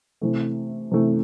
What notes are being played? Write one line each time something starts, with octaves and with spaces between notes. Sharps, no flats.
C3 E3 A3
C3 E3 A3